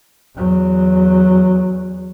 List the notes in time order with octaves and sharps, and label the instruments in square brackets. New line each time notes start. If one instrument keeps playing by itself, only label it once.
[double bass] E2 F#3